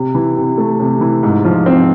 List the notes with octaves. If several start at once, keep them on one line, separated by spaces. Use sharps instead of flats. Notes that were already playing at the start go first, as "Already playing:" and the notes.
Already playing: C3
E3
C3
A3
C3
E3
G#2
F3
C4